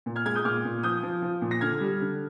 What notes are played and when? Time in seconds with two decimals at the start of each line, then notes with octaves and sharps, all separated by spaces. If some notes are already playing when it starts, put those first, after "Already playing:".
0.06 A#2
0.16 F6 G#6
0.26 G#3 F6 G#6
0.35 D#6 G6
0.45 A#2 D6 F6
0.65 A#2
0.83 F3 D#6 G6
1.03 F3
1.22 F3
1.42 A#2
1.51 A#6
1.61 D3 F6 G#6
1.81 G3
2.01 D3